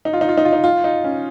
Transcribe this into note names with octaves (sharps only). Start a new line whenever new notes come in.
D#4
F4
D#4
F4
D#4
F4
D#4
F4
D#4
C#4